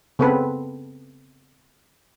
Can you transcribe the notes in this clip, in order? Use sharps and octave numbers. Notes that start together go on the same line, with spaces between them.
C#3 B3 C4 A4 B4